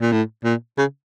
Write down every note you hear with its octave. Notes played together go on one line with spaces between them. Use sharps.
A#2
A2
A#2
C#3